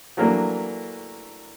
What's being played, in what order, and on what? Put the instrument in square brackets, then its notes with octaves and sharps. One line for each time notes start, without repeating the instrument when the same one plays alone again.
[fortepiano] E3 F#3 A3 A#3 D4